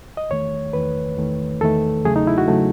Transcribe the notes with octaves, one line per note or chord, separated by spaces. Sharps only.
D#5
E2 D#3 A3 C#5
E2 D#3 A3 B4
E2 D#3 A3
E2 D#3 A3 A4
E2 C#3 F#3 A3 G#4
D#4
E4
F#4
C#3 F#3 A3